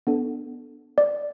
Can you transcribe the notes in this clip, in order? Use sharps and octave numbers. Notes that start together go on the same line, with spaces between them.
B3 D4 A4
D5